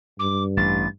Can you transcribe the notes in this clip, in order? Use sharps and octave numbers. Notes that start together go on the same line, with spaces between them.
G2 D6
A1 A6